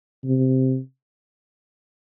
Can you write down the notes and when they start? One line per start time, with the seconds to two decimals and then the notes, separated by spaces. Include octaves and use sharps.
0.24 C3